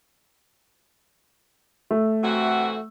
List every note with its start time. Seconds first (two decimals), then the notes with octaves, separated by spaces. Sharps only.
1.91 A3
2.23 C3 E3 F#4